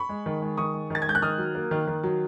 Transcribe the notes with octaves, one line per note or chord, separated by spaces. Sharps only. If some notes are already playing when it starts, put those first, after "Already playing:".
Already playing: B5 C#6
G#3
D#3
G#3
D#3 C#6 D#6
G#3
D#3 A6
G#6
G#3 G6
F#6
D#3 D#6 F6
F#3
A#3
D#3
D#3
F#3